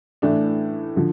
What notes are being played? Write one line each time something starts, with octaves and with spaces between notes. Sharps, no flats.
A2 E3 A3 D4
D3 F3